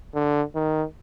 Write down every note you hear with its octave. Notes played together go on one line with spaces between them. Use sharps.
D3
D#3